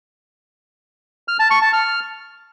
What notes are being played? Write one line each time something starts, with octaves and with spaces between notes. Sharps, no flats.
F6
A5
C#6
A5
F6